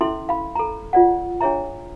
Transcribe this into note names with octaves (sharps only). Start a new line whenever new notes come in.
C#4 E4 A4 E5 C6
F5 B5
A4 A#5
F4 D5 F#5
D4 G#4 C#5 E5 A#5